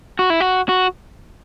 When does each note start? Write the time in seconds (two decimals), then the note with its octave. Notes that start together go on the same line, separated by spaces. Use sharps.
0.19 F#4
0.30 E4
0.40 F#4
0.69 F#4